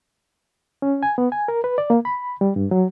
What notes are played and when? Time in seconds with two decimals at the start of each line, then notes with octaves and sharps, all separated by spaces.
0.82 C#4
1.03 G#5
1.18 B3
1.32 G#5
1.48 A#4
1.64 B4
1.78 D5
1.90 A#3
2.05 B5
2.41 G3
2.56 G2
2.71 F#3